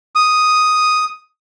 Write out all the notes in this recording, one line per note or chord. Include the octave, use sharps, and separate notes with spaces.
D#6